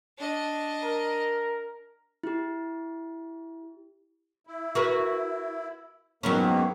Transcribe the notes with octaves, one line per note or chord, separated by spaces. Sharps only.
D4 D#5
A#4
E4 G4
E4
F#4 A#4 B4
G#2 D#3 F#3 A#3 B3 C#4